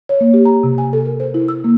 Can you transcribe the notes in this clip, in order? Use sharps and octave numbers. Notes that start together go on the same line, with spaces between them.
C#5
A#3
G4
A#5
C3
G#5
A4
A#4
C5
E4
E6
A#3